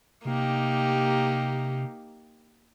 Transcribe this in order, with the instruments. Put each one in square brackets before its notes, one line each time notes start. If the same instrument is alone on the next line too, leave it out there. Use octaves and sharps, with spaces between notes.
[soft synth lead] C3 [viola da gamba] A#3 D#4 G4